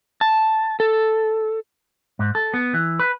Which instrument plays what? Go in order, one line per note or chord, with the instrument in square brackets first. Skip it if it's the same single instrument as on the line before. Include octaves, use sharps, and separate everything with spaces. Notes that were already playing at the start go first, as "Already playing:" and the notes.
[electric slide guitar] A5
A4
[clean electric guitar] G#2
A4
B3
E3
B4